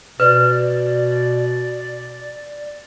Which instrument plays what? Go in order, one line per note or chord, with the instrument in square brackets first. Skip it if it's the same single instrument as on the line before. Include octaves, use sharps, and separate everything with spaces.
[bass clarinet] B2 [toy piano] B4 [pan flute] D5